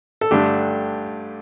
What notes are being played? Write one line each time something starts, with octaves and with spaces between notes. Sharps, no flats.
A4
G2 D3 A3 D4 G4